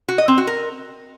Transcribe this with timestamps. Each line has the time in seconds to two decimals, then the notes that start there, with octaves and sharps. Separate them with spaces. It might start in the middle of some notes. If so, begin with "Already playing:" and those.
0.08 F#4
0.18 D#5
0.28 C4
0.38 F#4
0.47 A#4